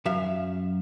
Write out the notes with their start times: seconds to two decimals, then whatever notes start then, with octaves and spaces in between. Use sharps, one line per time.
0.05 F#2 F#3 E5 F5